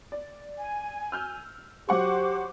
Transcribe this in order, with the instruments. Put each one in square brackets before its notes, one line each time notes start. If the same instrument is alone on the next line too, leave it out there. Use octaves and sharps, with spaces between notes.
[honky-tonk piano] D5
[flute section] G#5
[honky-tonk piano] E6 F6 G6
[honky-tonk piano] F#3 F#5 C#6 [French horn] G4 [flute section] C5 D6